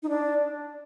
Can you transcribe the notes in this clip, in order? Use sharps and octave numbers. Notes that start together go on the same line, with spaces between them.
D#4
D4